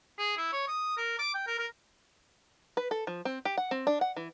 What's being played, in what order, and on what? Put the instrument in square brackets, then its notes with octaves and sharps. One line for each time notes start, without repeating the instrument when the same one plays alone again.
[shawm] G#4
E4
C#5
D#6
A#4
D6
G5
A#4
A#4
[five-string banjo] B4
A4
F3
C4
G4
F#5
C4
D4
F#5
E3